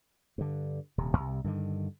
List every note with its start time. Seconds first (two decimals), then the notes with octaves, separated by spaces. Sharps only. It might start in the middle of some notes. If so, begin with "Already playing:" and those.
0.38 G2 D3
0.98 D#1 C3
1.17 C2 C3
1.44 G2 D3 D#3